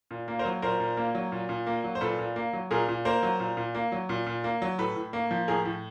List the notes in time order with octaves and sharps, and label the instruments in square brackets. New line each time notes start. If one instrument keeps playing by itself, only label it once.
[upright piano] A#2
A#3
A#4 C5
F#3
A#2 A#4 C5
A#2
A#3
F#3
A#2
A#2
A#3
F#3
C5
A#2 A4 B4
A#2
A#3
F#3
A#2 G#4 A#4
A#2
A#3 A#4 C5
F#3
A#2
A#2
A#3
F#3
A#2
A#2
A#3
F#3
A2 A4 B4
A2
A#3
F3
A2 G#4 A#4
A2